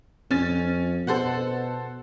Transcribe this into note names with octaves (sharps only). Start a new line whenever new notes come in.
F2 C#4 A6
B2 A4 C5 F#5